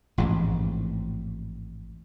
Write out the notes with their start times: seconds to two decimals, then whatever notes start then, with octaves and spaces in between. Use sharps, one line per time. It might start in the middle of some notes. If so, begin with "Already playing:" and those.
0.18 A1 F2 G#2